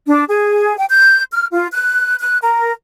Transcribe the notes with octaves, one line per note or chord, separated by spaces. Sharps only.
D4
G#4
G5
G6
F6
F4
F#6
F#6
A#4